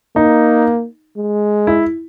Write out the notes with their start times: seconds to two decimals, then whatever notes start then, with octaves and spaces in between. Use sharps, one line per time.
0.16 A#3 D#4
1.17 G#3
1.67 E4